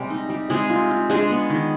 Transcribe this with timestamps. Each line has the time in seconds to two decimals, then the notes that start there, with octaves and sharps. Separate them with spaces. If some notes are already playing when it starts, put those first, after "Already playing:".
Already playing: C3 G3 G#3
0.10 D#4
0.30 G3
0.50 C3 G#3 G#4
0.70 F4
0.91 F4
1.10 G#3 D4 G#4
1.30 B3
1.50 D#3